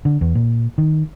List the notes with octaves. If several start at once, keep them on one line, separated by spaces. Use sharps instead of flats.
D3
E2
A#2
D#3